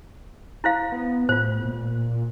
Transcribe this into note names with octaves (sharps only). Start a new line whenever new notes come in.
E4 C5 F5
B3
A2 F4 C5
A#2